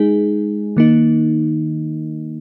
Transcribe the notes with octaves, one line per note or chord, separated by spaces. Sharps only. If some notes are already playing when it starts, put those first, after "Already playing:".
Already playing: G#3 D#4 G#4
D#3 A#3 D#4